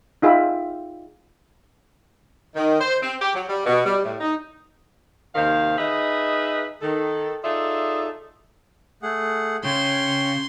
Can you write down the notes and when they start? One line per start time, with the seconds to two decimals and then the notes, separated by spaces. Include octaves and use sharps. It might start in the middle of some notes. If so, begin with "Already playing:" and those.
0.22 D#4 F4 G#4 E5 G5 B5
2.56 D#3
2.81 C5
3.03 C4
3.22 G4
3.34 F#3
3.49 G3
3.66 B2
3.86 G3
4.04 A2
4.20 D#4
5.35 D#2 C3 D#3 C5 F5
5.78 D#4 G#4 B4 D#5 E5
6.81 D#3 A4
7.44 D#4 F4 G#4 A4 D5 E5
9.03 A3 G#4 F#5
9.64 C#3 C#5 G5 C6